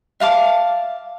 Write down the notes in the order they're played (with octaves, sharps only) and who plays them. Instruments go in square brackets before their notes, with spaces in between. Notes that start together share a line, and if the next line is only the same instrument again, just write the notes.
[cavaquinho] E5 F5 A5 D6